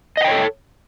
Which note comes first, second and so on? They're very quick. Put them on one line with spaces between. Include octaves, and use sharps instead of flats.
D#5 F#5 G5 C#5 A4